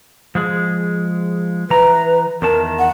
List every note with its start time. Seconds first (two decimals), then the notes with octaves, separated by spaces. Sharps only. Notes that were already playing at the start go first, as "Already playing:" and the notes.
0.35 F3 G#3 G#4
1.70 E3 B4 A#5
2.42 E2 D#3 A#4 A5
2.79 F#5